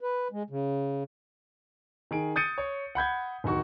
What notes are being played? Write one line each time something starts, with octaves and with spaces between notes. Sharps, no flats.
B4
G#3
C#3
D#3 G#4 D7
D#6 G6 A6 C#7 D#7
C#5
F#5 B5 G6 G#6
D1 D#3 F#4 C#6